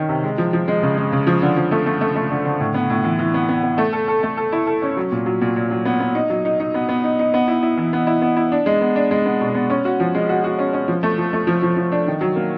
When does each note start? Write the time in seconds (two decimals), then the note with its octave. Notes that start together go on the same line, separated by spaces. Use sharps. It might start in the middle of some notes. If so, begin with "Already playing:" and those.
Already playing: D#3 C#4
0.09 C3
0.24 G#3
0.38 F3
0.53 F3
0.68 G#3
0.83 C#3
0.97 G#3
1.12 C#3
1.27 F3
1.42 D3
1.56 F3
1.71 A3
1.86 A3
2.01 A3
2.15 A3
2.30 D3
2.45 D3
2.60 A2
2.74 B3
2.90 A2
3.04 E3
3.19 E3
3.34 B3
3.49 B3
3.63 B3
3.78 A3
3.93 A4
4.08 A4
4.23 A3
4.37 A4
4.52 E4
4.67 A4
4.82 C#4
4.97 F#3
5.12 A#2
5.26 F#3
5.41 A#2
5.56 A#2
5.71 F#3
5.85 B3
6.00 B3
6.15 D#4
6.30 F#3
6.45 D#4
6.60 D#4
6.74 B3
6.89 B3
7.04 D#4
7.19 D#4
7.34 B3
7.48 E4
7.63 E4
7.77 E3
7.93 B3
8.07 E4
8.22 B3
8.37 E4
8.52 D4
8.66 G#3
8.81 B3
8.96 D4
9.11 G#3
9.26 B3
9.41 B2
9.55 B3
9.70 C#4
9.85 F#4
10.00 F3
10.15 G#3
10.29 F#4
10.44 F#4
10.59 C#4
10.73 C#4
10.88 F3
11.03 A3
11.18 F3
11.33 A3
11.47 F3
11.62 F3
11.77 F3
11.92 D4
12.07 D#3
12.21 F#3
12.36 A#3